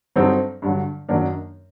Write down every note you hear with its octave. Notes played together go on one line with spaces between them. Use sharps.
G2 F#3 C4 D#4 A4
G2 D3 F#3
F#2 D#3 F#3 A#3 D4